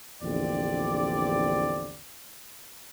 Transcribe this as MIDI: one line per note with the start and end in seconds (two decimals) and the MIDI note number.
0.21 1.99 34
0.21 1.99 40
0.21 1.99 50
0.21 1.99 60
0.21 1.99 67
0.21 1.99 74